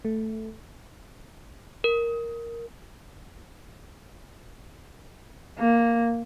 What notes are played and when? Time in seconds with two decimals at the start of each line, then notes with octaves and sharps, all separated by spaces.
0.05 A3
1.84 A#4
5.59 A#3